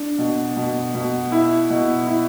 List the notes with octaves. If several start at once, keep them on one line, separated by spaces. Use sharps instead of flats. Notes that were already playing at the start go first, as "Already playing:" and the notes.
Already playing: D4
B2
B2
B2
E4
B2
E4